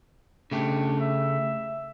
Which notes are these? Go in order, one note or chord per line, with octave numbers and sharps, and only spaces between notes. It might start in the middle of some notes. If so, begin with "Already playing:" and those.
C#3 A3 D4 G4
E5